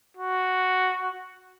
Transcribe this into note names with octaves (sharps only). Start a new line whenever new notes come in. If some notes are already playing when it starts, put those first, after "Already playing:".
F#4